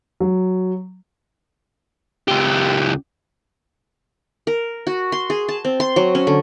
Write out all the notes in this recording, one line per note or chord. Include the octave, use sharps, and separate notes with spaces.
F#3
C#2 G4
A#4
F#4
C6
G#4
A5
C4
C6
F#3
C#4
D3